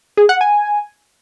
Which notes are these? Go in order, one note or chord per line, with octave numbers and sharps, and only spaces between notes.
G#4
F#5
G#5